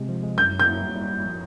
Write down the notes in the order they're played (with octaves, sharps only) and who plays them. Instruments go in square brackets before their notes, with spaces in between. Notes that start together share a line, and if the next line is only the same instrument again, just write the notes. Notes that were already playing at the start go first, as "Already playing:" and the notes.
Already playing: [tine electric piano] C3 G#3
F3
G#3
[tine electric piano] F#2 [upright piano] G6
[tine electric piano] F#3
[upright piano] G6
[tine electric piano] A#3
G3
G3
E4
F3